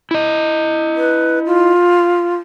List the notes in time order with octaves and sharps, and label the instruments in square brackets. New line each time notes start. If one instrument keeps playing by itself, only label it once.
[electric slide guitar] E4 D#5
[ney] B4
F4